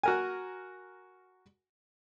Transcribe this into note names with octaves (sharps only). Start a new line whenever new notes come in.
F#4 A#4 G#5